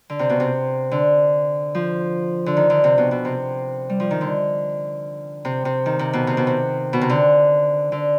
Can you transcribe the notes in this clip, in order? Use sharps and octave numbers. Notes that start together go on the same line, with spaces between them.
D3
C3
B2
C3
D3
F3
D3
D#3
D3
C3
B2
B2
C3
G3
F3
D#3
D3
C3
C3
D#3
C3
B2
C3
B2
C3
B2
C3
D3
D3